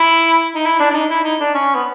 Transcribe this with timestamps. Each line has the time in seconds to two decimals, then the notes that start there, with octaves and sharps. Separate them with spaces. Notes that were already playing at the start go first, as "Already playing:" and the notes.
Already playing: E4
0.55 D#4
0.65 E4
0.80 D4
0.91 D4
0.94 D#4
1.10 E4
1.24 D#4
1.40 D4
1.54 C#4
1.75 B3